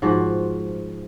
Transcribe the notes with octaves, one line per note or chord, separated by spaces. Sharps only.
G#2 F3 F#4